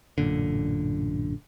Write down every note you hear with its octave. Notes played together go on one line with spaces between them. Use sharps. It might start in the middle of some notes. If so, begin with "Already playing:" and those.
A1 F#2 A#2 D3